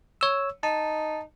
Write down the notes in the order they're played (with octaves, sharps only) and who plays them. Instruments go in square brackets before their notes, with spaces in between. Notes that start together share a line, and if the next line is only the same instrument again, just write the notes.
[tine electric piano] C#5 E6
[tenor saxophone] D#4 [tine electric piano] A5